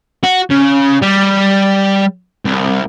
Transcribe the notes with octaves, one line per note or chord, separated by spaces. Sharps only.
F#4
C#3
G3
C2